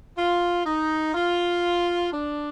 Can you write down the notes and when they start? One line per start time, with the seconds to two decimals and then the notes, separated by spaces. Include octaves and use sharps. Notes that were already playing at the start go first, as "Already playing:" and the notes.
0.17 F4
0.66 D#4
1.14 F4
2.12 D4